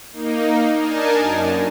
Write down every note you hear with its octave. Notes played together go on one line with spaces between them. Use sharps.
A#3 D#4
D4 D#4 A#4 G#5 A5
F#2